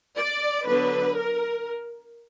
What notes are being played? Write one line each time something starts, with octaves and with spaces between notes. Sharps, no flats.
D5
D3 F#3 B3 D4 B4
A#4